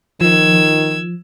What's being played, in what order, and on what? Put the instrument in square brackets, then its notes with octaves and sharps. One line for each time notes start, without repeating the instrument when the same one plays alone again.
[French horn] D#3 [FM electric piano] F3 [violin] E6 G#6